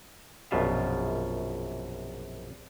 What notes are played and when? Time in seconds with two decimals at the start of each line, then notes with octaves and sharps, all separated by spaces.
0.51 A#1 F#2 B2 F4 E5 F5